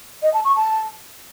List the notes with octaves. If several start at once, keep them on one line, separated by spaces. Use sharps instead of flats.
D#5
A5
C#6
A5